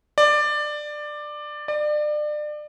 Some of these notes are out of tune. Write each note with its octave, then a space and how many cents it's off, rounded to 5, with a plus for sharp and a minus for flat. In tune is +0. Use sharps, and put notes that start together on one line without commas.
D5 +15
D5 +30